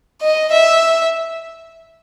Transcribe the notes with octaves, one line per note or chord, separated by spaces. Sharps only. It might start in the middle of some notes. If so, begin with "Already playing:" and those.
D#5
E5